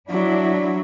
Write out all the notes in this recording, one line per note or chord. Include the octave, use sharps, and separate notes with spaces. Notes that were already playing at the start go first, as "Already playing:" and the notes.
F#3 D4 E4